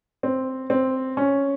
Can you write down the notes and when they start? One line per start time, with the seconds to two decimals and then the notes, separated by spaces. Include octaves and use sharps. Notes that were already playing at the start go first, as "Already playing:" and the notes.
0.23 C4
0.70 C4
1.17 C#4